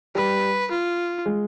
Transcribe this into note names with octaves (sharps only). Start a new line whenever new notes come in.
G3 B4
F4
G#3